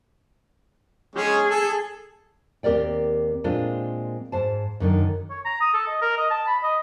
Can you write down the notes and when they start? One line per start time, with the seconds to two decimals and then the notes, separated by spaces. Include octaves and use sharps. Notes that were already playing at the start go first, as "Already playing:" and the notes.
1.16 G#3 C#4 G#4
1.51 A4
2.63 D#2 C4 G4 A#4 D5 G5
3.44 A#2 G#3 C4 D4 F4 A4
4.32 G#2 C5 A5
4.80 F#2 D3 D#3
5.30 C#5
5.45 A#5
5.61 D#6
5.74 A4
5.88 D#5
6.02 A#4
6.17 D#5
6.31 A5
6.47 B5
6.63 D#5